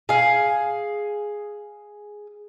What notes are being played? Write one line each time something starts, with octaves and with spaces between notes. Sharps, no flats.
G#4 F5